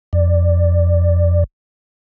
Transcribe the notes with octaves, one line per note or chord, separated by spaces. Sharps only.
F2 D5